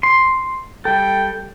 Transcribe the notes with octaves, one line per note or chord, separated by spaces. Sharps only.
C6
G3 A4 G5